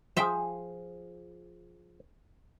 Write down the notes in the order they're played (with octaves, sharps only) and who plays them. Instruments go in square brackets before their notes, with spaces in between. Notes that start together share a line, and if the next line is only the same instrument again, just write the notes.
[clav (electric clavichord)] F3 G#4 [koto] C5 E5 G5